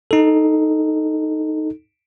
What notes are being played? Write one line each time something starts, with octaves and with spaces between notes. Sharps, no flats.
D#4 A4